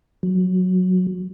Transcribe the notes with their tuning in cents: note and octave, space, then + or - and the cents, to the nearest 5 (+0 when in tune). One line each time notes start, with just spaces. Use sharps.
F#3 -10